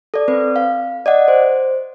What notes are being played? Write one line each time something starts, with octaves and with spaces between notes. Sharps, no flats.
A4 D5
C4 B4
F5
D5 D#5 F#5
C5